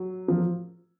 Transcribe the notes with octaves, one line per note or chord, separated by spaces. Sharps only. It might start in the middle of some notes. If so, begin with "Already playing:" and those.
Already playing: F#3
F3